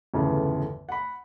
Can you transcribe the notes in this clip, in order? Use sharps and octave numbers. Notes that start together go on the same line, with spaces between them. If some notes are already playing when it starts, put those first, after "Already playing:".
G1 E2 A2 C#3 F3
F#5 B5